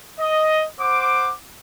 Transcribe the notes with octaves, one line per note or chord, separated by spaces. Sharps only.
D#5
C5 F#5 D6